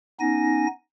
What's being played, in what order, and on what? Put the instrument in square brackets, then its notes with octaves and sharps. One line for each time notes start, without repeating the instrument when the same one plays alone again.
[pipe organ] B3 C#4 D#4 G#5 A#6